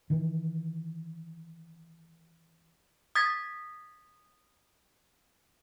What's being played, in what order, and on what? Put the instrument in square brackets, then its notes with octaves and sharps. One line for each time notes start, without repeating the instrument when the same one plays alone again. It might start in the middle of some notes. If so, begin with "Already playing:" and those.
[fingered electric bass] D#3 E3
[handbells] D#6 G#6 A6 B6